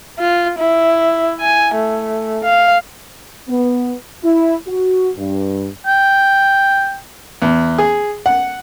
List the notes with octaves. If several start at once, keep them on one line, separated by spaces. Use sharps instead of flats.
F4
E4
G#5
A3
F5
B3
E4
F#4
G2
G5
E2
G#4
F#5